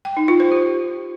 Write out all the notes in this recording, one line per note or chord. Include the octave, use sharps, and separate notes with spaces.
G5
D#4
F4
C5
G4